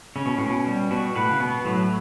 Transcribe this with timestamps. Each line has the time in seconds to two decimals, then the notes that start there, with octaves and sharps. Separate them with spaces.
0.16 C#3 C#4
0.26 B2
0.38 A2 C#4
0.49 B2
0.66 G3
0.91 B2 F#4
1.15 A2 B4
1.31 C#3
1.40 B2 B3
1.65 A2 F#3